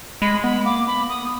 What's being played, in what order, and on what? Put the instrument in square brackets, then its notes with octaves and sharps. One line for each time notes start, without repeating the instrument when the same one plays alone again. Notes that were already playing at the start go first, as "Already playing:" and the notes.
[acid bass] G#3 [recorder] B5
[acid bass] B3 [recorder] B5
[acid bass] A#3 [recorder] D6
[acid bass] B3 [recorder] B5
[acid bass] A#3 [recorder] D#6